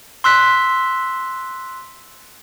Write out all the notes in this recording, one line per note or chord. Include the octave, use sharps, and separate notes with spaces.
C6 E6 F#6 B6